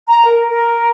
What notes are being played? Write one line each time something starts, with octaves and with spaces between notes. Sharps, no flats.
A#5
A#4
A#4